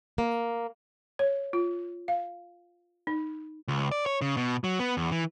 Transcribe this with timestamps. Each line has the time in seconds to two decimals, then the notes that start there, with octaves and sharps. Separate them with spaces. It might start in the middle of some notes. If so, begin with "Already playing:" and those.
0.18 A#3
1.19 C#5
1.53 F4
2.08 F5
3.07 D#4
3.68 C#2
3.92 D5
4.06 C#5
4.21 C#3
4.37 B2
4.64 F#3
4.79 B3
4.97 E2
5.12 E3